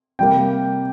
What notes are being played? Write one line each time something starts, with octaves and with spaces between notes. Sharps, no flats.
C3 G3 A#3 G5